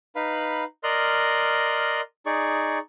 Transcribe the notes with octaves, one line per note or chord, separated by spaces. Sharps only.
D#4 B4 F5 B5
A#4 D5 D#5 C6 F6 F#6
D#4 G#4 D5 C#6